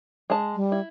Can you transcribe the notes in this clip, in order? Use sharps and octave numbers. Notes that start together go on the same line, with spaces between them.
G#3 A5
G3
E4